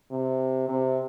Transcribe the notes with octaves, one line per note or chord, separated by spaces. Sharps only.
C3
C3